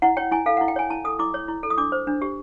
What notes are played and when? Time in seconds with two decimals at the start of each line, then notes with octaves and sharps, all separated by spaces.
0.02 E4 F#5
0.17 C#5 G5
0.32 E4 G#5
0.46 A4 F5
0.57 E4 F#5
0.68 G5
0.76 C#5 G#5
0.90 E4 A5
1.04 A4 D#6
1.19 E4 D6
1.34 C#5
1.48 E4
1.63 A4
1.70 D#6
1.77 D4 D6
1.92 C5
2.07 D4
2.22 G4